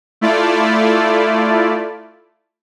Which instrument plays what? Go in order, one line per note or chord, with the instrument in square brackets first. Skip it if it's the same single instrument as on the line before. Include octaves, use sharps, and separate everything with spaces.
[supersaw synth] A3 E4 F4 D5